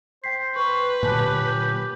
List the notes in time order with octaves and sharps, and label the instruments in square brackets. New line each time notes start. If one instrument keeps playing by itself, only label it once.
[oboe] C5 [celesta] G5 B6 C7
[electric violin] B4 [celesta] C#6
[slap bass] A#2 D3 F#3 [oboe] G4 [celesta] G#5 A5 F#6
[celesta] G6